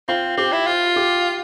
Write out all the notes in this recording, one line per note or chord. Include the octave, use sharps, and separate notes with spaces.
C4 F4
C4 G4
E4
F4
G4